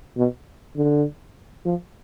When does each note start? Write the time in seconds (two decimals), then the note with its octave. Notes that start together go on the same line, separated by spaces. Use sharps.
0.17 B2
0.76 D3
1.65 F3